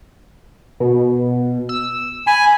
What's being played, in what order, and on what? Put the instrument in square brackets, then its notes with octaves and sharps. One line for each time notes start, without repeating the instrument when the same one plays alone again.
[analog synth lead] B2
E6
[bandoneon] G#5 [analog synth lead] B5